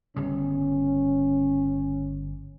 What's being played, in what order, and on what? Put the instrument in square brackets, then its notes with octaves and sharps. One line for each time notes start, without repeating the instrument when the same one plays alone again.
[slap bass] G1 C#3 G3 [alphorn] C#4